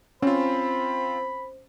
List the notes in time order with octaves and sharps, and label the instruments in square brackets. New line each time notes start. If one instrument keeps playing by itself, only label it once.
[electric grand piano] C4 F4 [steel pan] C#4 [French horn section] C5 [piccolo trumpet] B5